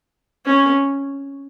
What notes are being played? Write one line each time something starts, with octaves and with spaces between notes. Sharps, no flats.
C#4